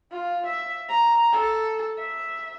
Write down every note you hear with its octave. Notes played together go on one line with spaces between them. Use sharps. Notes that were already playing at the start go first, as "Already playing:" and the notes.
F4
E5
A#5
A4
E5